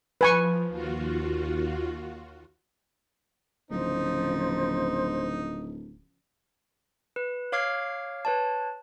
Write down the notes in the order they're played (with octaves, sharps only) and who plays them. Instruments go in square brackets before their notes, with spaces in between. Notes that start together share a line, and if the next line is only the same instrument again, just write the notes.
[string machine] F3 [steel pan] B4 G#5 C#6
[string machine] D#2 F4 F#4
[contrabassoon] D1 [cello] C#3 F3 [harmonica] D#4 [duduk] C5
[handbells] B4
C#5 F5 D6 F6 G#6 C7
B4 C#5 A5